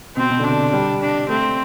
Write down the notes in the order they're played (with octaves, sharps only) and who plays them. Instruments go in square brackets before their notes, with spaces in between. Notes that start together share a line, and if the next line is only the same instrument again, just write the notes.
[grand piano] B2 [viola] C4
[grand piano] B2
D3
[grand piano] C3 [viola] D4
[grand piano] G3
[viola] D4
[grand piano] A3 [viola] C4